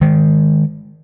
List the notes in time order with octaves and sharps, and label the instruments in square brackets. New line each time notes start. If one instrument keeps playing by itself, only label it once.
[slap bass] D#3 G#3